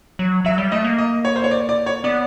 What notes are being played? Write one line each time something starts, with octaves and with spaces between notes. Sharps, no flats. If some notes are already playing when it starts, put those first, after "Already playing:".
F#3
F#3 E5
G3
A3 D#5
A#3
D#5
C#5
C5
C#5
D5
D5
C#5
B3 D5